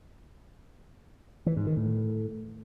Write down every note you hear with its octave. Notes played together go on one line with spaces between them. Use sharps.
E3
G#2
D#3
A2